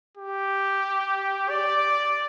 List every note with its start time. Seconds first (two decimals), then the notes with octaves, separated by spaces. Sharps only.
0.17 G4
1.49 D5